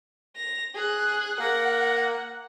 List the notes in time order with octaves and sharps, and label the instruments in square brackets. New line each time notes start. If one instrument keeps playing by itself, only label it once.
[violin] A#6 F7
G#4 F#6
[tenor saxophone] A#3 [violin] F#5